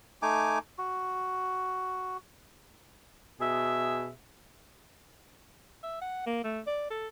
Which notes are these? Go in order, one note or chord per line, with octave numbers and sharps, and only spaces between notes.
A3 D#4 G#5 D6
F#4
B2 G#4 E5
E5
F#5
A#3
A3
D5
A4